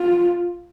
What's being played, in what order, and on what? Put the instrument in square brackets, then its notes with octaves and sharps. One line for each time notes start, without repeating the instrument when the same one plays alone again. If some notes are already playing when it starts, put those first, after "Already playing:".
Already playing: [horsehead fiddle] F4